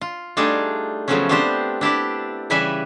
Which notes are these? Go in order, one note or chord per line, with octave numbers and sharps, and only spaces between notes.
F4
G3 A3 D4 D#4 F4 G#4
C#3 F3 F#3 A3 B3 C#4
B3 C4 D4 F4 G4 C5
D4 E4 G4 D5
C#3 E3 G3 B4 E5 G#5